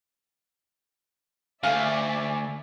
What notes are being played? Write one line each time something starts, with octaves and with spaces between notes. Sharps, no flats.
D2 D5 E5 F5 G#5